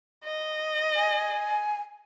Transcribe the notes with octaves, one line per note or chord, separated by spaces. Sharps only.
D#5
G#5